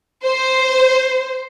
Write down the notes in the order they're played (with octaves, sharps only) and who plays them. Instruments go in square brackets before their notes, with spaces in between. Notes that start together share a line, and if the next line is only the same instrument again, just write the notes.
[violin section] C5